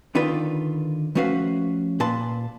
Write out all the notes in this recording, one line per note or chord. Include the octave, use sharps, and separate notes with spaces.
D3 D#3 D4 F4 B4
F3 A3 C#4 F#4 B4 F5
A#2 B4 A5 C6